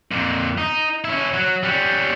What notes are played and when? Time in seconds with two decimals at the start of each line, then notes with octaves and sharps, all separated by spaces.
0.11 F2 A#2
0.58 D#4
1.04 C#4 E4
1.34 F#3
1.63 G3 C#4